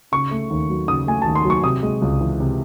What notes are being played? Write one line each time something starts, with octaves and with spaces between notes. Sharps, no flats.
C#3 C#6
A3
D#2
F#3
C#3 D#6
A3 G#5
D#2 A5
C6
F#3
C#6
C3 D#6
G#3
C#2
E3
C3